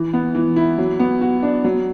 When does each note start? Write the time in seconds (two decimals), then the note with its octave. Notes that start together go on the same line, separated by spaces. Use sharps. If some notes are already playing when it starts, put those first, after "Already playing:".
Already playing: E3
0.13 B3
0.35 E3
0.56 E4
0.78 F#3
0.99 B3
1.21 F#4
1.43 D4
1.64 F#3